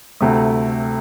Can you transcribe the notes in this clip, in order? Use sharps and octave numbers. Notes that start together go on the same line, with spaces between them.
D2 C3 A3